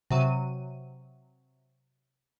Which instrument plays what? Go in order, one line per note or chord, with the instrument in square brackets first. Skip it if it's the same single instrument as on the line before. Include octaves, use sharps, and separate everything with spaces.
[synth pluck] C3 F#3 D#7